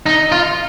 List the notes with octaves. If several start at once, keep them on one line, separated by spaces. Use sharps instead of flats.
D#4
F4